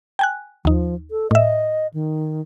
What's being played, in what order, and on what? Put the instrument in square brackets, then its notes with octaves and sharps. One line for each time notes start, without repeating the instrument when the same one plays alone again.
[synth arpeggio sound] G5 G#5 F#6
[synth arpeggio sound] D#2 D#4 [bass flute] F3
[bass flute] A4
[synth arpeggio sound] A2 E5 [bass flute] D#5
[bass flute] D#3